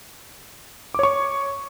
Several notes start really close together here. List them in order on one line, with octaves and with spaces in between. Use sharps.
D6 C#5 C#6